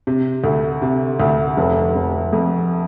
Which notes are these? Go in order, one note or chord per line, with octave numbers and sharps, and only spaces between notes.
C3
D2
C3
D2
F1
F1
F2